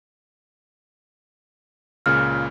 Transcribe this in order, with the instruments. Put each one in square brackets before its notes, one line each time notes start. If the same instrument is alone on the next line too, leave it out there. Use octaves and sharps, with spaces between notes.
[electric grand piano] C#2 A#2 C#3 [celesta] F6